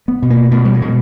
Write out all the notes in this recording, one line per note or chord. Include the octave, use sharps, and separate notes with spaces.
B3
B2
A#3
B2 A3
G3
G#3
B2